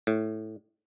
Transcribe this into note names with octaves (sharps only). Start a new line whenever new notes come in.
A2